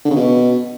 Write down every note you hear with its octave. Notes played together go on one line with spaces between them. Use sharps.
D3
C#3
B2